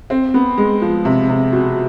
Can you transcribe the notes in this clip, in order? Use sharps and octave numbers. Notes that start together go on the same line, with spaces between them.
C4
B3
G#3
F3
C3
C3
B2